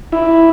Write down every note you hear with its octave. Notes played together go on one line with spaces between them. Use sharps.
E4